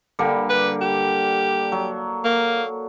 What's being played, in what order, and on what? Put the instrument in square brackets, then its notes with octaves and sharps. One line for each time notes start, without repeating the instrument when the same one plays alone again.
[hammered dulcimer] D3 G3 A#3
[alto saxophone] B4
G4
[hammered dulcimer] F#3
[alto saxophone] A#3